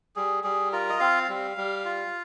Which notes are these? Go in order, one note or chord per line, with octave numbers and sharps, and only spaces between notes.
G3 G#4
G3 G#4
F4 A#4
D#5
C4 F5
G3
G3
F4